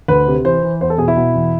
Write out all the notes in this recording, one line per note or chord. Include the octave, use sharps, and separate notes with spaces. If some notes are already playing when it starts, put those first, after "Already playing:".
D2 B4
C3
E3 C5
E3
E2 C5
A4
B2 G#4
E4
B2
E2